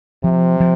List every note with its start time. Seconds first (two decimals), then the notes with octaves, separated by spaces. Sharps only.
0.24 C3 F3
0.60 F3